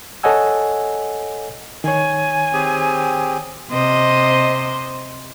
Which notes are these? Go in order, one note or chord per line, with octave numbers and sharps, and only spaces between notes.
A4 C#5 D#5 F#5 G#5 E6
D#3 C#5 G#5
C4 G4 G#4
C3 C5 D#5